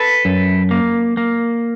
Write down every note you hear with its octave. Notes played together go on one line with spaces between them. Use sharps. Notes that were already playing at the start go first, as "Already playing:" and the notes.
Already playing: A4 B4
F#2
A#3
A#3